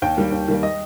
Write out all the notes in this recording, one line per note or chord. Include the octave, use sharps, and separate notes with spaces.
D#2 G5
D#3 G3 A#3
D#2
D#3 G3 A#3
D#5